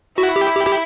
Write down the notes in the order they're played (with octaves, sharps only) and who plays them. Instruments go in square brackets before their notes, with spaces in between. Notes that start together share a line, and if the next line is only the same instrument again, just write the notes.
[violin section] E4 [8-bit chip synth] F#4
[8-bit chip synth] G4
G4
G4